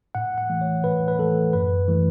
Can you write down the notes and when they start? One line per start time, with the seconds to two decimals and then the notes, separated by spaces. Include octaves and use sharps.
0.15 A2 F#5
0.38 F#5
0.50 E3 A3
0.61 C#5
0.84 A2 B4
1.08 B4
1.19 E3 A3 A4
1.53 F#2 B4
1.88 E3 A3